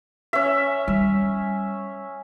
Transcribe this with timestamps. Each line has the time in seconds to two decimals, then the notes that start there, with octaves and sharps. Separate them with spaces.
0.33 C#4 E5
0.88 G3